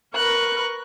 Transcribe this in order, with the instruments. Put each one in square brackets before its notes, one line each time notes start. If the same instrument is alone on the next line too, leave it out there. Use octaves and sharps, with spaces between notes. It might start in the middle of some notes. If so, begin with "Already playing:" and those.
[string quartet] A#4 B4 C#6 [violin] F#6